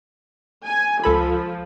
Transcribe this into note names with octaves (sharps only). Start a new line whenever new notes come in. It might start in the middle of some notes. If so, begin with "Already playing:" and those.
G#5
C#2 F3 A4 B5